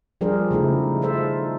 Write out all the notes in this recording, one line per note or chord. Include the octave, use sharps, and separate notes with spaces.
F3 G3 D4 G#4 A#4 C5
C#3 A3 D#4 E4
D#4 F4 A4 C5 E5